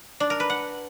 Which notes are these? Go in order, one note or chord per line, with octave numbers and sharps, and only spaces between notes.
D4
A#4
B4
F#5